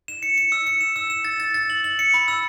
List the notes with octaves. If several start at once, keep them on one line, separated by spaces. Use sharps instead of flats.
E7
C#7
C#7
E6
C#7
E7
E6
E7
A6
A6
A6
F#7
F#7
C#7
B5
E6